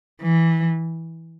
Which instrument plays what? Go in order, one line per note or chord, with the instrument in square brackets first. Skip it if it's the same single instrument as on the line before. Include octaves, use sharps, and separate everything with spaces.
[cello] E3